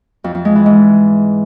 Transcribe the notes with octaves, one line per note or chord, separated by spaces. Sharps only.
F2
F2
G#3
E3
G#2